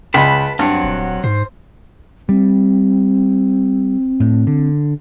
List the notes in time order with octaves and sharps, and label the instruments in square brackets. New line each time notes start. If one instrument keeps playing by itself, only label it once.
[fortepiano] C#2 [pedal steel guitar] B4 A5 B5
[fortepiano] G2 [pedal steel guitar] F#3 C4 F#5
[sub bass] D#1
[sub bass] G#2 [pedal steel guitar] C5
[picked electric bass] G3 [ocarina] C4
[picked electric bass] A2
D3